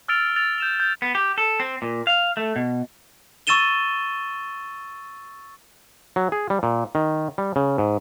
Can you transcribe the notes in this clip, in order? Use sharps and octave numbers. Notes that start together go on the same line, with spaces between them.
E6 F6 A6 D7 F7
E6 A6 F7
G6 E7 F7
G6
B3
G4
A4
C4
A#2
F5
A3
B2
C#6 E6 A6 D#7 E7 G7
F#3
G#4
G3
A#2
D#3
G3
C#3
G#2